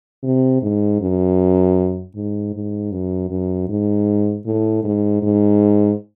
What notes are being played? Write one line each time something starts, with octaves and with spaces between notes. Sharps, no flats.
C3
G#2
F#2
G#2
G#2
F#2
F#2
G#2
A2
G#2
G#2